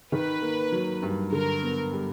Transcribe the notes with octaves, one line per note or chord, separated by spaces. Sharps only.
D#3 B4
A#3
F#3
G2
D3 A#4
B3
G3